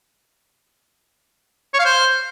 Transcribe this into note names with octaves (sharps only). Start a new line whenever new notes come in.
C#5
F5
C5